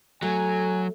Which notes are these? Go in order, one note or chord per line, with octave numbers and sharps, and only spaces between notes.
F#3 A3 G#5